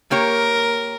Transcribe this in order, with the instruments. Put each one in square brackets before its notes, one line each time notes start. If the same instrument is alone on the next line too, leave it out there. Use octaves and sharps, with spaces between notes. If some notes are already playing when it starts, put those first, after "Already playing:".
[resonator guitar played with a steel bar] A#3 G4 C#5 [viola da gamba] A#4